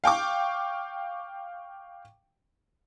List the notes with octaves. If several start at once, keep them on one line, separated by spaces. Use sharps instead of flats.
F5 G5 C#6 D6